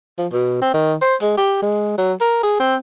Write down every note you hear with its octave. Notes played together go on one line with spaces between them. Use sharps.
F3
B2
C4
D#3
C5
G#3
G4
G#3
F#3
A#4
G#4
C4